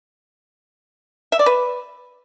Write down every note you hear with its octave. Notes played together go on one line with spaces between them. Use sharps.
E5
D5
B4